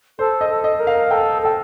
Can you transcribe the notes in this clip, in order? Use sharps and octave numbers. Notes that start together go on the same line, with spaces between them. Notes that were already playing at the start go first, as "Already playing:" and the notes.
A4 C5
D#5
A4
D#5
A#4
F5
A4 G5
A4 G5